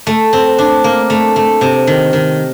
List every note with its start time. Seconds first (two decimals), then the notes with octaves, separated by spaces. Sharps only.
0.07 A3
0.33 C4
0.59 D4
0.84 A#3
1.10 A3
1.36 A3
1.61 C3
1.87 D#3
2.13 D#3